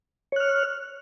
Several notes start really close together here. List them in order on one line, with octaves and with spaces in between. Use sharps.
C#5 F#6 F6